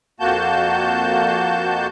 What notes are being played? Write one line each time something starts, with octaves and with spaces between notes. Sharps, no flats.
F2 A#3 F#4 A5 G6